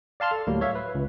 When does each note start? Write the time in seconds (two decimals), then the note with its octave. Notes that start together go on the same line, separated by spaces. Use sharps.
0.20 D5 F5 A5 C6 F6
0.31 A4
0.47 D2 A2 F#3 G3 A#3
0.61 C#5 E5 F5
0.75 B4
0.95 C#2